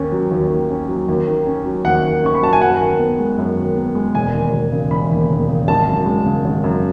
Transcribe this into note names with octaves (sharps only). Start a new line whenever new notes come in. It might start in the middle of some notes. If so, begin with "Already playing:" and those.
Already playing: D#2 D#3 C#4
F#3
D#2
D#3
C#4
F#3
D#2
D#3
C#4
F#3
D#2 F#5
D#3
C#4 C#6
B5
F#3 A5
G#5
F#2 F#5
D#3
B3
G#3
F#2
D#3
B3
G#3
E1 G#5
D#2
E1
C#3
E1 B5
D#2
E1
C#3
G#1 A5
F#2
G#3
C#3
G#1
F#2